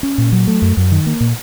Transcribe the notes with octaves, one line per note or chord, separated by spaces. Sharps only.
C#4
A#2
F#3
A3
F#2
F#2
D#3
A#3
A#2